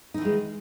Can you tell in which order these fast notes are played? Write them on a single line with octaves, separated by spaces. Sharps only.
D#4 E3 D#3 G#3